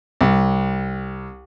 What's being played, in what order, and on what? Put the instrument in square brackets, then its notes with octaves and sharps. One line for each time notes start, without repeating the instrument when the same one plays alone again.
[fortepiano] C2